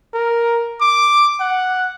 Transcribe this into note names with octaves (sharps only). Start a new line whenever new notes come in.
A#4
D6
F#5